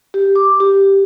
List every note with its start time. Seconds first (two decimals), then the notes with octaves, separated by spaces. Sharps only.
0.14 G4
0.36 D6
0.60 G4